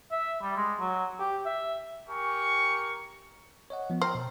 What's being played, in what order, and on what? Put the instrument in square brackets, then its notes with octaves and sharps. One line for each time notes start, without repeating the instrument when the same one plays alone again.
[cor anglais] E5
G3
G#3
F#3
G4
E5
[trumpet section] G4 A#4 G#5 C#6
[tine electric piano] C#5 D#5 F#5
F3 B3
[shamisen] C5 [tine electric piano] G5 A#5 F6
[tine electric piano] B2 A5